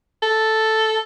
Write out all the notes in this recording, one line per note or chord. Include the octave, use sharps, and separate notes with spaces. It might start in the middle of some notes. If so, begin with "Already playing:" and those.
A4